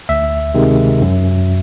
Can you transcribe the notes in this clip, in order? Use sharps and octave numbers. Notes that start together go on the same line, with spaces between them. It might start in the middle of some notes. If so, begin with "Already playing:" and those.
D2 E5
C3 D#3 G#3
F#2